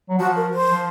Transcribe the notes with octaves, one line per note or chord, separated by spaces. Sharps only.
F#3
F3 F#4
A#4
C5
F3